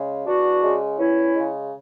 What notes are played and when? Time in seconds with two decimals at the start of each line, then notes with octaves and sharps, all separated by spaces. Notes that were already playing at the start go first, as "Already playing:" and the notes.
Already playing: C#3 G#3
0.26 E2 D4 F#4
0.63 C#3 G#3
0.98 E2 C#4 E4
1.35 C#3 G#3